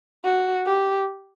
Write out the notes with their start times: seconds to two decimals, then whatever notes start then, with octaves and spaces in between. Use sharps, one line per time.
0.24 F#4
0.66 G4